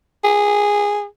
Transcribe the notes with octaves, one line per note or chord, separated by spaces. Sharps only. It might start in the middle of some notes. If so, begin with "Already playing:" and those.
G#4